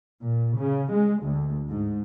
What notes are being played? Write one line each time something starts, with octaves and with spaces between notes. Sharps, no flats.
A#2
C#3
G#3
D2
G#2